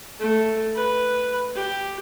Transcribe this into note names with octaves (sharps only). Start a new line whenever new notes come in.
A3
B4
G4